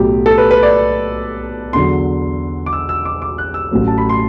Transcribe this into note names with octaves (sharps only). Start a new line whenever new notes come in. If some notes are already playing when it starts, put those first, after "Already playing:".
Already playing: B1 A2 F#3 G4
A4
B4
B4
D5
E2 D3 F#3 C6
D6
E6
E6
D6
D6
F#6
E6
A1 A2 F#3
A5
B5
C6